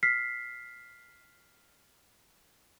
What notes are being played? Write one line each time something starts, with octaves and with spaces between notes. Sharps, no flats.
F6 B6 C7